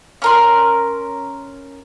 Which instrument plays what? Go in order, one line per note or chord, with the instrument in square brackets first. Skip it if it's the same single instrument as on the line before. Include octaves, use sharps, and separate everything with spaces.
[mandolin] C#4 A#4 C6